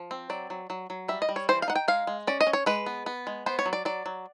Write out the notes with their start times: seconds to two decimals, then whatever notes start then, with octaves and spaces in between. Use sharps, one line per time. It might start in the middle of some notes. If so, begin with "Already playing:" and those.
Already playing: F3
0.11 C4
0.30 F#3 D5
0.50 F#3
0.70 F#3
0.90 F#3
1.08 G3 E5
1.22 D#5
1.29 G3
1.36 C#5
1.49 E3 C5
1.62 F5
1.68 D#4 F#5
1.76 G5
1.88 G#3 F5
2.07 G#3
2.27 C#4 D5
2.41 D#5
2.47 C#4
2.53 C#5
2.66 G#3 B4
2.86 B3
3.06 B3
3.27 G#3
3.46 B3 C5
3.59 C#5
3.66 F#3
3.73 D5
3.85 F#3 D5
4.06 F#3